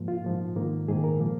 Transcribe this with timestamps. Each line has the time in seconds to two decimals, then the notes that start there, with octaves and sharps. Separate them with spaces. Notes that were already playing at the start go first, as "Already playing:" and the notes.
Already playing: G#2 F3 A#3
0.08 F4
0.24 G#2 F3 A#3
0.56 G#2 D#3 A#3
0.88 G#2 D#3 A#3 G#4
1.04 A#4
1.20 A#2 F3 A#3